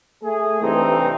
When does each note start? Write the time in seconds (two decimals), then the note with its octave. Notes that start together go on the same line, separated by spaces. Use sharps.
0.23 A3 G#4
0.62 G2 C3 E3 A3 C4 D#4